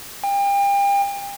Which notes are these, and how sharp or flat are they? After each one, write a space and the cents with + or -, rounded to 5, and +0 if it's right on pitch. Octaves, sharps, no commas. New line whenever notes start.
G5 +35